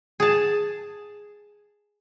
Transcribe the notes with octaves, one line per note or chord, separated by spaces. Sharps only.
G#4 A5